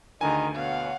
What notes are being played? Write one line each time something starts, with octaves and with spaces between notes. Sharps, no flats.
D2 D3 D#3 G#4 A#4 D#5 G#5
B2 C#5 F5 F#5